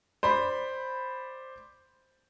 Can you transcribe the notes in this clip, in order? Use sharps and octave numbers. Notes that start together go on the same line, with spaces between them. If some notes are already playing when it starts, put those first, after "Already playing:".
C5 D5 B5